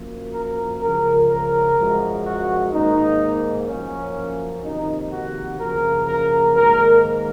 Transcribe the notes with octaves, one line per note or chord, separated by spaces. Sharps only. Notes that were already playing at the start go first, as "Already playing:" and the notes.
Already playing: F#2 F3 A#3
A#4
C#2 C#3 F3 A#4
A#4
F#2 F3 G#3
F#4
G#2 D#3 A#3 D#4
F#2 F3 A#3 C#4
F2 C3 D#3 A#3 D#4
F#4
F#2 C#3 F3 A#3 A#4
A#4
G#2 D#3 A#3 A#4